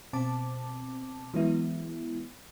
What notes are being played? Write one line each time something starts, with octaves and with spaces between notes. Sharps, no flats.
B2 C4 A5 D6
E3 F#3 G#3 B3 E4